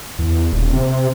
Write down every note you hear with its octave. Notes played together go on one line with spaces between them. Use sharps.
E2
D#1
C3